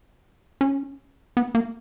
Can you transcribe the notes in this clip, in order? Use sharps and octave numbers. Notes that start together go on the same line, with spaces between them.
C#4
B3
A#3